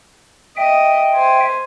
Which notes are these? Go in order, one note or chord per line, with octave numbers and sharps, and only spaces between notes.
D#5 E5 G5
C5 G#5